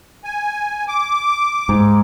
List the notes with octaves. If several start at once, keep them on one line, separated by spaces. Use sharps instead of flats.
G#5
D6
G#2